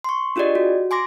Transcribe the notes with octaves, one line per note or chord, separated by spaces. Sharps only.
C6 C#6
D4 F4 G4 G#4 D5 D#5
F#4
G#5 C6 D6 A#6